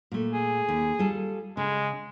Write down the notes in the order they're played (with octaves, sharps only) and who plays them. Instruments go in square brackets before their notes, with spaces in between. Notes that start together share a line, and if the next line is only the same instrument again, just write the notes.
[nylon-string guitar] A#2 A3
[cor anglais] G#4
[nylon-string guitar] D#2
G3 F4 A4
[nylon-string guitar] C#3 [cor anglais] G#3